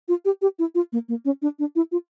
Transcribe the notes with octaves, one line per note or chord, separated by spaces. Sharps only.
F4
G4
G4
E4
F4
A#3
A#3
C#4
D4
D4
E4
F4